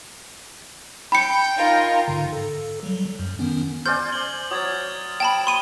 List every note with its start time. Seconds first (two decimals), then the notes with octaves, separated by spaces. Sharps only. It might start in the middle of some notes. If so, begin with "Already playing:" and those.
1.12 G5 B5 C#7
1.55 D#4 F4 A#4
2.08 G#2 D3
2.33 A4
2.83 F#3 G3
3.19 F#2
3.39 D#3 B3 C#4
3.86 C5 D5 G#5 F6 G6
4.12 F#7 G7
4.51 F#3 D#6 G#6 A6
5.20 G5 A5 B5
5.47 C6 D#6 D#7 G7